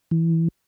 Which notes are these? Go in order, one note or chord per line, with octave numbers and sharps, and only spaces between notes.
E3